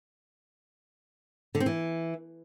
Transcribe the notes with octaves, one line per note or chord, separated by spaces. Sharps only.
D3
C4
E3